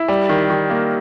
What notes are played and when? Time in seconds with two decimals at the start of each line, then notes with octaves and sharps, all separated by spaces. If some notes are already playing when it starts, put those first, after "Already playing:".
Already playing: E4
0.08 G3
0.29 D#3
0.50 D#3
0.70 A#3